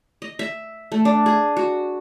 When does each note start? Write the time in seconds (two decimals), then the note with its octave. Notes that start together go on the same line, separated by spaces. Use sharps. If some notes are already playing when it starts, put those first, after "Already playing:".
0.22 D#5
0.39 E5
0.92 A3
1.05 D4
1.26 G#4
1.57 F#4